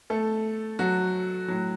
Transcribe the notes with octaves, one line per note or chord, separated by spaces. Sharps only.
A3 A4
F#3 F#4
A2 F#3